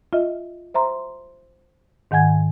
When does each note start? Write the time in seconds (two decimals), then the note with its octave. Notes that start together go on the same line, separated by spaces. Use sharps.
0.13 F4 D#5 E5
0.74 C5 E5 A#5 C6
2.11 G#2 D#3 F#5 G#5 G#6